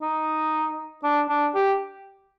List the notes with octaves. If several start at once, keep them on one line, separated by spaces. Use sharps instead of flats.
D#4
D4
D4
G4